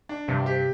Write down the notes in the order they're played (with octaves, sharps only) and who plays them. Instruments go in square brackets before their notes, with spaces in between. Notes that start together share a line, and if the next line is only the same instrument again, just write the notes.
[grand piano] D4
[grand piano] G2 [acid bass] C3
[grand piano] G4